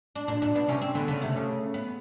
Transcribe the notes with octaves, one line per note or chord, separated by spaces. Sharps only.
D4
A#2 D4
A#2 D4
B2 D4
C3 C#4
C4
D3 B3
C#3 B3
C3 A3
C#3
B3